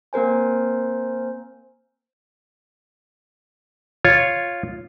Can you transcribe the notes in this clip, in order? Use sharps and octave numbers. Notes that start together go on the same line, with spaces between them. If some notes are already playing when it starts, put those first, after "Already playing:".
A#3 C4 A#4 C5 G#5
F4 C#5